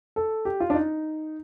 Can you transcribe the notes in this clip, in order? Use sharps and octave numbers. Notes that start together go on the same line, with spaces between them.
A4
G4
F4
D4
D#4